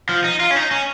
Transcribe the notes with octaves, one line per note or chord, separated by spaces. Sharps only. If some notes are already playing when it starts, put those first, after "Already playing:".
F3
D#4
F4
C#4
D#4
C#4